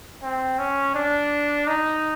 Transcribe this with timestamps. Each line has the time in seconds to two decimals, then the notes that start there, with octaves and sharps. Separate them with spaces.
0.22 C4
0.58 C#4
0.94 D4
1.67 D#4